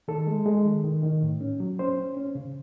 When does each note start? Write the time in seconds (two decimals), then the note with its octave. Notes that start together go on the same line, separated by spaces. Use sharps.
0.08 D#3 A4
0.27 G#3
0.46 G#3
0.65 D#3
0.84 D#3
1.03 D#3
1.22 A2
1.41 C#4
1.60 F#3
1.79 C#4 C5
1.97 C#4
2.17 C#4
2.35 C#3